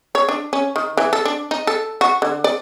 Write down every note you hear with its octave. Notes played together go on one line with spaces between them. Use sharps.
C#5
D4
C#4
D#3
E3
A4
D4
D#4
A4
F#4
D3
D5